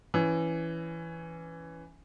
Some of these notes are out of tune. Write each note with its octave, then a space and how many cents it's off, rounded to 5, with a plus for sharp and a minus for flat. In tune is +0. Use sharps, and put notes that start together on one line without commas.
E3 +10 C#4 +15